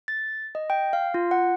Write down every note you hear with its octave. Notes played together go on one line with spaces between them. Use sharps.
A6
D#5
G5
F5
F4
F#5